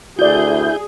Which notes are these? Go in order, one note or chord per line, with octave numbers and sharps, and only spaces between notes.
D2 E4 F#4 G#4 D5 G6